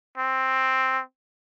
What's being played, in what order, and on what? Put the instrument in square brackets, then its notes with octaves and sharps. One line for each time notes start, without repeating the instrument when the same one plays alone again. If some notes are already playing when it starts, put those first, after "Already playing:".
[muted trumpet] C4